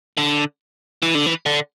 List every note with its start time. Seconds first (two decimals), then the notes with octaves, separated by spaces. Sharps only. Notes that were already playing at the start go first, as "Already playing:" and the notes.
0.17 D3
1.03 E3
1.15 D3
1.26 E3
1.46 D3